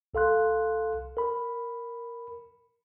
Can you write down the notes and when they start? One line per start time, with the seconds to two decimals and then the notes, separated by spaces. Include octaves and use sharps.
0.14 C2 A4 F5 C6 F#6
1.17 A#4 B5